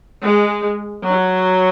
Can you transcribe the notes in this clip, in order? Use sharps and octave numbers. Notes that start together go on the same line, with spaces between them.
G#3
F#3